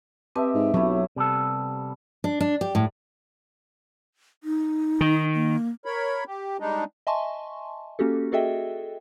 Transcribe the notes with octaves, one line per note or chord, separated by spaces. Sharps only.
C4 G4 B4 D#5 E5 A5
G#2
B1 F#3 A3 E4
C3 G3 B3 A4
D4
D4
G4
A2
D#4
D#3
A#3
A#4 C#5 B5
G4
G3 G#3 D4 D#4
D#5 E5 G#5 A5 C6 C#6
A#3 C#4 F#4 G4 A4
F#4 G#4 A4 D#5 E5 G5